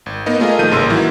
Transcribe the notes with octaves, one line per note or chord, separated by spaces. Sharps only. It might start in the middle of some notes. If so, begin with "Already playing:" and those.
G#1
A#3 B3 D#4 D#5
A3 F4 G#4 A#4 D#5
A#1 D#3 F3 A3 G6 D#7
A1 G#2 C#3 A#3 C6 E6
D#3 E3 F#3 A#3 E4